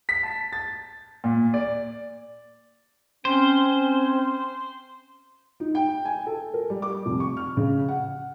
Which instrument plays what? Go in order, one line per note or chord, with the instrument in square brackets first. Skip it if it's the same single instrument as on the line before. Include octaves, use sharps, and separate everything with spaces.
[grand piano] B6
A5
A6
A#2
D5
[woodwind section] C4 C#4 [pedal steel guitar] C5
[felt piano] D#4
G5
G#5
A4
A#4
G3
D6
F1
C#6
F6
C#3
F#5